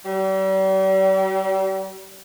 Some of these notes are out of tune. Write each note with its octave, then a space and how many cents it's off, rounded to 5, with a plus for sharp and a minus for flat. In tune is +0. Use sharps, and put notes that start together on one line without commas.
G3 -40